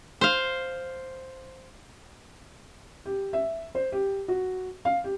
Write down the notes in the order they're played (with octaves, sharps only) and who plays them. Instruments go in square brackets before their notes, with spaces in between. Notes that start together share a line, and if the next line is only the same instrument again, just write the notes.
[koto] C5 F5
[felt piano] G4
E5
C5
G4
F#4
F5
G4